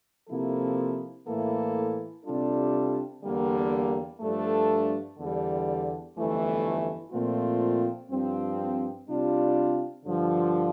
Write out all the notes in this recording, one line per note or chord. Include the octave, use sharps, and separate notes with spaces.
C3 F3 A#3 E4 A4
A2 E3 A#3 E4 A4
C3 G3 D4 F4 A4
E2 D3 G3 A#3
G2 F3 A3 D4 A4
E2 D3 G3
G1 F2 E3 A3
A#2 F3 A3 C4 F4
G2 F3 C4
C3 G3 D4 F4
G2 D3 F3